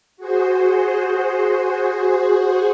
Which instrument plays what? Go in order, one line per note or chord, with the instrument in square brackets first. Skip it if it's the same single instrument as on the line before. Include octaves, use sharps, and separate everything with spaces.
[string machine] F#4 G#4 C5